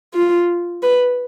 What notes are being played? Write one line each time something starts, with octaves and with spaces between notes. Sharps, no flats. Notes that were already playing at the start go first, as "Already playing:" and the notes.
F4
B4